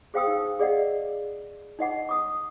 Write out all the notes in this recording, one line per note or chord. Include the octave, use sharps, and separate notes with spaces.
G#4 C5 F5 G5 D#6 E6
D#4
G#4 D5 D#5 F5 F#5
D#4 D#5 F#5 D6
D6 D#6